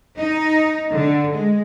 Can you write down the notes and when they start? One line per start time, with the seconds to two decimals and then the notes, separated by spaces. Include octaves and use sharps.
0.17 D#4
0.91 D3
1.33 G#3